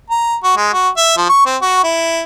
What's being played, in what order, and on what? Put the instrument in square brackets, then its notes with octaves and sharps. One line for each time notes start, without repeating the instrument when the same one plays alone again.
[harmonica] A#5
F#4
G#3
F#4
E5
F3
C#6
C4
F#4
E4